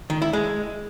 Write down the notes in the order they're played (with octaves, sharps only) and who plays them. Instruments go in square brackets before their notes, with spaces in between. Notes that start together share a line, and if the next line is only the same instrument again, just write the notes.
[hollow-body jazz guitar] D#3
E4
G#3